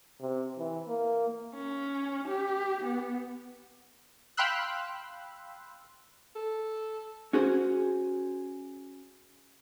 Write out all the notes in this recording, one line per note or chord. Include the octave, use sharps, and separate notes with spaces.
C3
E3
A#3
C#4
G4
B3
F5 G5 B5 C6 E6 F#6
A4
C#4 F#4 G#4 C5